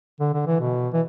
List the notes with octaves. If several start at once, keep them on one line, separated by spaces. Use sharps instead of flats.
D3
D3
E3
B2
E3